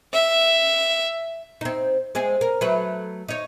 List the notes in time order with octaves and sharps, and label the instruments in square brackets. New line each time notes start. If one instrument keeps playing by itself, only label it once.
[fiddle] E5
[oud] C4 D#4
G#3 C4 G#4
A#4
F#3 A3 B4
D#4 C#5